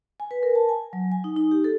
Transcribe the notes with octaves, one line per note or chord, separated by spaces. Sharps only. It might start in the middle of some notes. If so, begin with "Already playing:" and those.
G#5
B4
A#4
A5
G#5
F#3
G#5
D#4
D#4
G4
A4